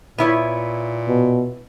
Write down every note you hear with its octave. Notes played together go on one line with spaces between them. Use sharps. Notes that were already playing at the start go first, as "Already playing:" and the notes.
A#2 B3 E4 C#5
B2